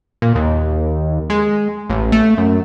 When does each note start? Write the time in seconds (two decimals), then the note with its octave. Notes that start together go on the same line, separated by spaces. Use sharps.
0.22 A#2
0.35 D#2
1.30 G#3
1.90 A1
2.12 A3
2.38 F#2